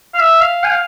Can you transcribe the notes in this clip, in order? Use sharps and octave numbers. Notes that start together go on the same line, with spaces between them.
F5
E5
F5
G#5
F5